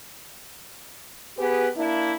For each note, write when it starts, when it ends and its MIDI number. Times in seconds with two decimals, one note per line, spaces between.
1.37 1.67 59
1.37 1.67 67
1.37 1.67 68
1.37 1.67 71
1.75 2.13 58
1.75 2.13 62
1.75 2.13 64